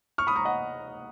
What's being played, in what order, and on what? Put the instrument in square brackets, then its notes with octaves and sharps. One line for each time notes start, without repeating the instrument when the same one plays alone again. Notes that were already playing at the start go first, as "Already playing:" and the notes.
[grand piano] C#6 F6
B5 D#6
A#5 C#6
D#5 F#5